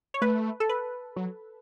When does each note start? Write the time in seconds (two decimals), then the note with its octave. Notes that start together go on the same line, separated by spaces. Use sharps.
0.14 C#5
0.21 A3 B4
0.60 A4
0.69 B4
1.16 F#3